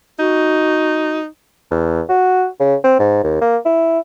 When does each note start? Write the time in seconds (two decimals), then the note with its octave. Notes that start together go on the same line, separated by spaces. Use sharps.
0.19 D#4 F#4
1.71 E2
2.09 F#4
2.60 C#3
2.84 C4
2.99 G#2
3.24 D#2
3.41 A#3
3.65 E4